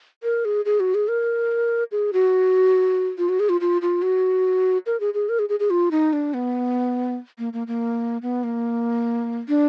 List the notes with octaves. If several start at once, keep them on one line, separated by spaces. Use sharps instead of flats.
A#4
G#4
G#4
F#4
G#4
A#4
G#4
F#4
F4
F#4
G#4
F4
F4
F4
F#4
A#4
G#4
G#4
A#4
G#4
G#4
G#4
F4
D#4
D4
B3
A#3
A#3
A#3
B3
A#3
D4